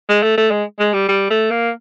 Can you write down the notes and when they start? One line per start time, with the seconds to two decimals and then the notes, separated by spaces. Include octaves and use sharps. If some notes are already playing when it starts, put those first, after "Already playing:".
0.09 G#3
0.23 A3
0.38 A3
0.51 G#3
0.79 G#3
0.94 G3
1.09 G3
1.31 A3
1.51 A#3